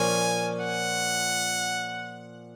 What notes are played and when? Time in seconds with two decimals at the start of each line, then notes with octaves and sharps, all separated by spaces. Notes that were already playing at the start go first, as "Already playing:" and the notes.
Already playing: A#2 F3 A#3 C#4 F4 G#5
0.61 F#5